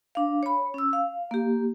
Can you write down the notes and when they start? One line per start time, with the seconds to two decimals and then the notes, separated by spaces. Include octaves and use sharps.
0.15 D4 F5
0.43 C#5 B5
0.74 C#4 E6
0.93 F5
1.31 A#3 G4